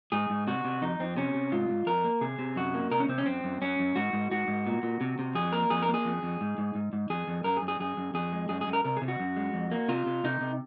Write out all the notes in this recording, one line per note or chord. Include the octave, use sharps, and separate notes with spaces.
G#2 G#4
G#2
C3 F#4
C3
F2 D#4
F2 C4
C3 C#4
C3
G#2 F4
G#2
F2 A#4
A#3
C3 G#4
C3
F#2 F#4
A#3
C3 A#4
C#4
C3 C4
C#4
F#2 C4
F#2
F#2 C#4
F#2
G#2 F#4
G#2
G#2 F#4
G#2
A#2
A#2
C3
C3
F2 G#4
A#3 A#4
F2 G#4
A#4
A#3
G#4
F2
F2
G#2
G#2
G#2
G#2
F2 G#4
F2
F#2 A#4
G#4
F#2
G#4
F#2 G#4
F#2
F2 G#4
G#3
F#2 G#4
G#4
F#2
A#4
C3 A#4
G#4
C3
F#4
F#2
G#3
F2
A#3
C3 F4
C3
C3 D#4
C3